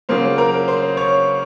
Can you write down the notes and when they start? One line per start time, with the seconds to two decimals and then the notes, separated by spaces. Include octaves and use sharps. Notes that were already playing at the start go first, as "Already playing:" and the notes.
0.09 C#3 F#3 A#3 F4 C5
0.38 A#4
0.68 C5
0.97 C#5